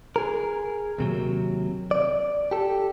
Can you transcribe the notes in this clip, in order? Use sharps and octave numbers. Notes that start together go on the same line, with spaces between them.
G#4 A#4
D#2 C3 F#3
D5
G4 A4